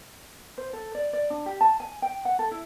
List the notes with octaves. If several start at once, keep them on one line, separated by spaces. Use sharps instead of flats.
C5
A4
D5
D5
D4
G4
A5
G#5
G5
F#5
A4
E4